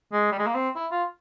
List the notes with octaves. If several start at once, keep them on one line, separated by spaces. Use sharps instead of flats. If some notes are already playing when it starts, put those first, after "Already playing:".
G#3
G3
G#3
A#3
C4
E4
F4